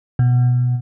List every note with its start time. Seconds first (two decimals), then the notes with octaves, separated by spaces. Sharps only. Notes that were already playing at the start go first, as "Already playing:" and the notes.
0.19 B2